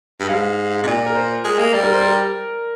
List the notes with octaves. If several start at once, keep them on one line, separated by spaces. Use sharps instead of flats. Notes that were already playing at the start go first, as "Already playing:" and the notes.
G2
G#2 F5
C3
A#2 D5
A#4
C5
G#3
A#3
G3 D5
A#4
C5
A#4